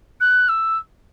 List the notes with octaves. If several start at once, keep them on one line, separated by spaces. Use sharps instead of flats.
F#6
E6